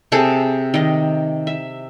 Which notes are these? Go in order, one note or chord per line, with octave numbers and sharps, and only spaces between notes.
C3 G#4 A4
D#3 D#5
E5